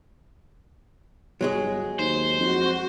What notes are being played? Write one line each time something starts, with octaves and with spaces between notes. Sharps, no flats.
G1 F#3 G#3 G#4
D#2 C5
F2 F#4